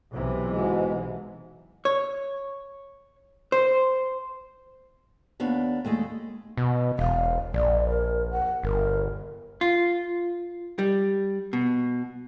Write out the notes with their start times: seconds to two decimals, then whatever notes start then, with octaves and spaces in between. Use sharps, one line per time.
0.13 B1 C3 E3
0.49 G#2 B2 G#3
1.85 C#5
3.52 C5
5.40 D#2 B3 D4 C#5 E5 F5
5.85 D#2 G#3 A3 G#4
6.57 B2
6.99 E1 F5
7.54 A#1 D5
7.89 A#4
8.31 F#5
8.63 G1 A#4
9.61 F4
10.79 G3
11.53 B2